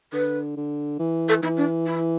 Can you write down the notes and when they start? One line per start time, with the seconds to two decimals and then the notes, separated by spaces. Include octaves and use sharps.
0.13 D3 B4
0.57 D3
0.99 E3
1.29 A4
1.43 E3 E4
1.57 D4
1.86 E4